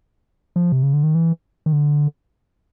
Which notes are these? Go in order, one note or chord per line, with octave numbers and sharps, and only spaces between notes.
F3
C3
C#3
D3
D#3
E3
D#3
D3